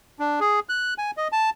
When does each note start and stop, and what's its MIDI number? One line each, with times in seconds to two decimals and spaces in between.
0.19 0.40 62
0.40 0.60 68
0.69 0.94 90
0.98 1.11 80
1.17 1.28 75
1.32 1.50 81